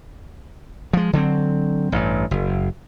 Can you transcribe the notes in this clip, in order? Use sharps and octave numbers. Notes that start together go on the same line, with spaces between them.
F3 G#3
D3 F#3 G3 C4
A1 G2
F#1